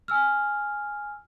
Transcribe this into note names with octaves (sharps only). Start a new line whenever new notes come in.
G#5 E6 F6